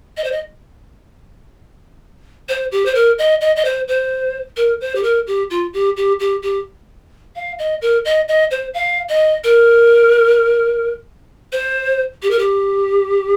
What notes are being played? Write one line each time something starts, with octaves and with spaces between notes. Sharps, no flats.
D#5
C5
D#5
C5
G4
C5
A#4
D#5
D#5
D#5
C5
C5
A#4
C5
G4
A#4
G4
F4
G4
G4
G4
G4
F5
D#5
A#4
D#5
D#5
C5
F5
D#5
A#4
C5
G4
A#4
G4